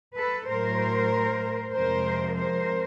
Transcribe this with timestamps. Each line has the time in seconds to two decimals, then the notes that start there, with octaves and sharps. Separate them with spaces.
0.15 A4 B4
0.47 A2 F#3 A#4 C5
1.72 F2 C3 F3 G#3 A#4 C5
2.35 A#4 C5